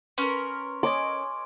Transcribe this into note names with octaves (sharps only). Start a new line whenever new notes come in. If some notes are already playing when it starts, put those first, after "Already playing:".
C#4 A#4 B4 C6 C#6 F6
C#5 D#5 G#5 C6 D6